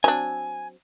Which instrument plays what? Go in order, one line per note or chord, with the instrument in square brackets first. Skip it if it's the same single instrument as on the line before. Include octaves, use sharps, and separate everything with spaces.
[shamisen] F#3 C4 D4 [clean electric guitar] G#5